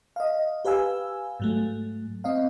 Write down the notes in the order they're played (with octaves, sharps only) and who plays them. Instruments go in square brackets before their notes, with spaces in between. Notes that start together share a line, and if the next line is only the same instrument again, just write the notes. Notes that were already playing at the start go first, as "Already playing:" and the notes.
[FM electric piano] D#5 F5
G4 B4 F5 G#5 E6
G#2 F#3 A3
C4 D#5 F5